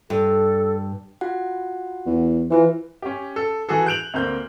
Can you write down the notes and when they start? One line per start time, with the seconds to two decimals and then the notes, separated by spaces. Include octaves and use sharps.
0.10 G2 A4
1.21 F4 F#4 F#5
2.06 E2
2.51 E3 F4 B4 C5
3.02 C#4 G4
3.36 A4
3.69 E3 F#4 G#4 A4
3.86 F#6 G6 D7 F7 F#7
4.14 D2 A#3 C4 G6